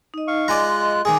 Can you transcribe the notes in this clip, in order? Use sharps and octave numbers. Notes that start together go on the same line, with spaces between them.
D#4 D#5
F5 C#6
G#3 F4 D5 D#5 G#5 A#5 F#6
D#3 G#3 G#4 G#5 D6